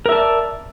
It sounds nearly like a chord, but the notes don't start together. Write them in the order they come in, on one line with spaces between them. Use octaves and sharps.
A#4 E5 A5 D5